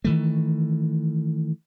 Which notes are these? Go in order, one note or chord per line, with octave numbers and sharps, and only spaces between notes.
D#3 E3 A3